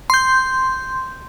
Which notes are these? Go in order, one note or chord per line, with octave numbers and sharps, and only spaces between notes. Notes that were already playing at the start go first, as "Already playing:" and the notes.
C6 G6